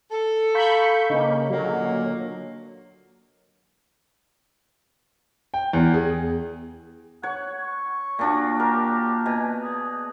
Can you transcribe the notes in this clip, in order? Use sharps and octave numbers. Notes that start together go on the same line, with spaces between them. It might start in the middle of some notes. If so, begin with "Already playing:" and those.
A4
F5 A#5 B5 C#6 G6
C#3 A#3 D#5
A#2 D3 F#3 A#3
G5
E2
G#4
C#5 F#5
C#6
A#2 D4 F#4
G4 A#4
B2 G#5
G#4